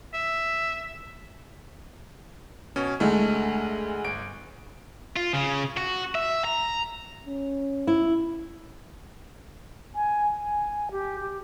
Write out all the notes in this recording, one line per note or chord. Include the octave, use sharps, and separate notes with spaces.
E5
B2 C#4
D2 G#3 A3
G1 D7
F4
C#3
F#4
E5
A#5
C#4
E4
G#5
G#5
G4
G4